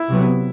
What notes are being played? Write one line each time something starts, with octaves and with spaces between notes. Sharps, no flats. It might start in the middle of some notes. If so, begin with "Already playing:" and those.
Already playing: E4
C3 F#3 B3